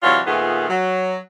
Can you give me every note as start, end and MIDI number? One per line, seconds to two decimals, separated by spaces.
0.03 0.20 48
0.03 0.20 52
0.03 0.20 54
0.03 0.20 65
0.03 0.20 73
0.03 0.20 74
0.27 0.67 46
0.27 0.67 51
0.27 0.67 57
0.27 0.67 59
0.27 0.67 65
0.27 0.67 68
0.69 1.16 54